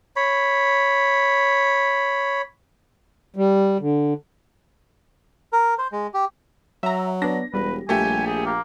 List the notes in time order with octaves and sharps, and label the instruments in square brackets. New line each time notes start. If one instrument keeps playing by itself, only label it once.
[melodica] C#5 B5
[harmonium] G3
D3
[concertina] A#4
C5
G#3
G4
[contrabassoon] F#3 [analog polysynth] E5 A#5
[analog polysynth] B3 D4 [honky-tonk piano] A#6
[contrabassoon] E1 [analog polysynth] G3 [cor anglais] B4
[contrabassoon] A#1 [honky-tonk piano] A3 G4 [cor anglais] G#5
[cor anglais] G#4
A#3